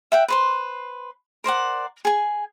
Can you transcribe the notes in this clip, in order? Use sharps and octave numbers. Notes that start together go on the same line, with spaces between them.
E5 F#5 G5
B4 C5 C6
A#4 C5 D5 F#5
G#4 G#5